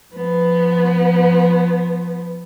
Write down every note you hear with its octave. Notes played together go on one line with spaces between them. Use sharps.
F3 B3